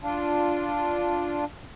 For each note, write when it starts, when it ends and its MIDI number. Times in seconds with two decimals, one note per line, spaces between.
0.01 1.44 62
0.01 1.44 65